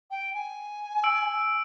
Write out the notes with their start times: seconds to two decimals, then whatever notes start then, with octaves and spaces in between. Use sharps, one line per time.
0.11 G5
0.34 G#5
1.04 E6 D7